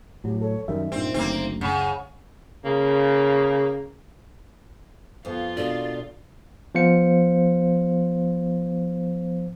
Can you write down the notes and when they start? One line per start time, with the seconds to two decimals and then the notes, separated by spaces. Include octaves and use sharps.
0.24 A2 F#3 G4
0.41 A4 C#5
0.68 F#2 D#3 G3 A#4 E5
0.92 G2 A#2 C4 D#4
1.14 F#1 D2 A#3 C4
1.61 C#2 F#2 C#3 F#5 B5
2.65 C#3 A#3
5.25 F2 B3 F4 F5
5.57 B2 A#3 D4 F#4 A4 D5
6.75 F3 B3 C5 F5 C#7